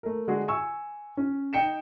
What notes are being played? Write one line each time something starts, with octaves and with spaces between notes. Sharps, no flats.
A3 A#4
D3 G#3 F#4 G#4
G#5 C#6 E6
C#4
D#4 G5 C#7 E7